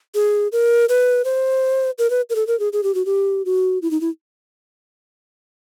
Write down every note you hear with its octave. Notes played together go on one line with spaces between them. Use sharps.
G#4
A#4
B4
C5
A#4
B4
A#4
A4
A#4
G#4
G#4
G4
F#4
G4
F#4
E4
D#4
E4